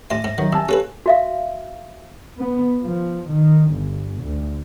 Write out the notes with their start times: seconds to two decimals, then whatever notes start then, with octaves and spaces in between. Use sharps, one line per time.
0.10 A1 E5 C6 A#6
0.24 G#2
0.38 D#3 F#3
0.53 C2 G#5 A5 E6
0.69 C#4 G4 A4 B4
1.06 F#4 E5 F5
2.36 B3
2.82 F3
3.31 D#3
3.73 G1
4.25 D2